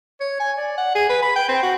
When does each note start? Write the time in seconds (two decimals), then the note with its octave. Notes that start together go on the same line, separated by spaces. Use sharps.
0.20 C#5
0.39 G#5
0.57 D5
0.77 F#5
0.95 G#4
1.09 B4
1.22 B5
1.36 G5
1.48 C4
1.63 F#4